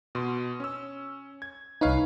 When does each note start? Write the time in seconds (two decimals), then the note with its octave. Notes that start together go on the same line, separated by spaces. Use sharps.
0.15 B2 C6
0.60 C#4 E6
1.42 G#6
1.81 C2 D#4 B4 C#5 F5